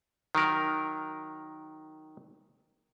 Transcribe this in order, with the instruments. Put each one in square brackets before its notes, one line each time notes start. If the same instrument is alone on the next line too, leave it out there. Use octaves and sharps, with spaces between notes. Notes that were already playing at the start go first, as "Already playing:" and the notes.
[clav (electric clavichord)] D#3 F#3 A#4